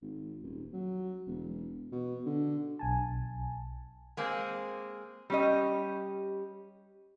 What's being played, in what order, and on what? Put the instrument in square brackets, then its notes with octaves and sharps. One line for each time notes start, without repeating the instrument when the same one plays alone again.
[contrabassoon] G#1
D#1
F#3
E1
B2
D3
[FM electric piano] B1 G#5 A5
[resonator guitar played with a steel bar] G#3 A#3 C4 G#4
G3 C#4 G4 D#5